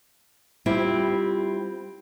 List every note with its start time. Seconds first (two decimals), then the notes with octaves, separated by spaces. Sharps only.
0.66 G3 C4 E4 F4 G4